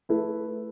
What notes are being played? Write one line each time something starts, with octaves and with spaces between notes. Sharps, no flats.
A3 E4 B4